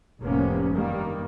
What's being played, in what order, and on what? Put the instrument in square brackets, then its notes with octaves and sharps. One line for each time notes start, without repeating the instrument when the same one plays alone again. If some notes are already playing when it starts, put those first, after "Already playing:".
[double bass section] F1 A2 C3 A#3 B3 C#4
G2 D#3 G3 A#3